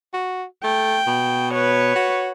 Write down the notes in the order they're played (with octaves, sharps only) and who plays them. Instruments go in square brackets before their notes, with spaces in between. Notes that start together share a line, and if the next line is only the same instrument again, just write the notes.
[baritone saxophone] F#4
[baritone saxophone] A3 [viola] G5
[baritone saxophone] B2
[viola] B4 C#5
[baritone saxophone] F#4